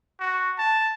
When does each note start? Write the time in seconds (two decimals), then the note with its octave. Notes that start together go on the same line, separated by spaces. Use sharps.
0.20 F#4
0.58 A5